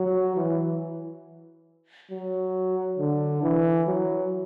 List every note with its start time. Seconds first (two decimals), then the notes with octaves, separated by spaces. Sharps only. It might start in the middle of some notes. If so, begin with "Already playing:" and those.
Already playing: F#3
0.36 E3
2.11 F#3
2.99 D3
3.43 E3
3.87 F#3